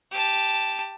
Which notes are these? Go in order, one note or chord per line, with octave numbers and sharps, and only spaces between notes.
G4 A5